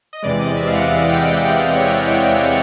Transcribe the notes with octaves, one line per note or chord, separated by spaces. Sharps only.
D#5
E2 C3 E3 G#3 D5
D#5
E5
F5
F#5
F#5
G5
F5
F#5
G5
C#5
D5
D5
C#5
D5